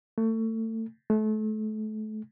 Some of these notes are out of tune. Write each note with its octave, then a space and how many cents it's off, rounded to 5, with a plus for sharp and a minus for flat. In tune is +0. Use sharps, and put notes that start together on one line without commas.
A3 +30
A3 -30